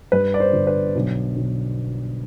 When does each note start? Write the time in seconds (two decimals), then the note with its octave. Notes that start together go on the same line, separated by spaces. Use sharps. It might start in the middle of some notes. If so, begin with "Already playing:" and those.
0.12 G2 B4
0.34 D5
0.40 C5
0.53 G1
0.67 B4
0.96 B1
1.36 B1